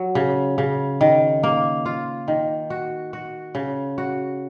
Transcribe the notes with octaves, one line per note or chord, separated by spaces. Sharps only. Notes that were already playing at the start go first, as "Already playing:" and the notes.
Already playing: F#3
C#3
C#3
D#3
A#3
F4
D#3
F#4
F#4
C#3
F#4